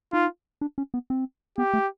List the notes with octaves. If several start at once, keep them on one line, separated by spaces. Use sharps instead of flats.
D#4 F4
D4
C#4
B3
C4
B3 G4
A3